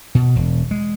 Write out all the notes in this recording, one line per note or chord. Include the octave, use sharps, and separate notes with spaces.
B2
E1
G#3